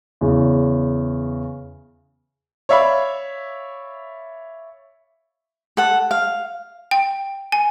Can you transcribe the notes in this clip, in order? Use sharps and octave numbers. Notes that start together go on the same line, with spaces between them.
E2 C#3
C#5 D5 E5 F5 B5
A4 F#5
F5
G5
G#5